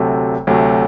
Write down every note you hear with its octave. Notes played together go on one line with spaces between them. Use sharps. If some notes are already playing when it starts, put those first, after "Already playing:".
Already playing: D2 C3 F#3 A3
D2 C3 F#3 A3